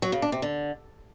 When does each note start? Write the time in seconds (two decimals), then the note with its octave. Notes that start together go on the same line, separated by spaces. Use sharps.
0.02 F#3
0.12 C#3
0.22 D4
0.32 C3
0.42 D3